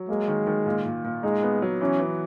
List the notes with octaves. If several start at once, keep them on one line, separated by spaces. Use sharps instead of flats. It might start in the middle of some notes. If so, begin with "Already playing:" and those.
Already playing: F#3
G#3 A#3
D#3
D#3
A#2
A#2
A#2
G#3 D#4
B3
F#3
E3 C#4
E3